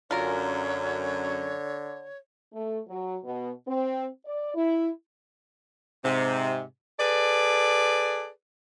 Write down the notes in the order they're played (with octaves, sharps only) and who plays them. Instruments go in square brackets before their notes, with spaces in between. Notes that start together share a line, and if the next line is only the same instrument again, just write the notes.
[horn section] F#2 [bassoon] D3 [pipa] F4 A#4 [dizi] C#5
[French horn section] A3
F#3
B2
C4
D5
E4
[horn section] G#2 C3
G#4 A4 B4 D5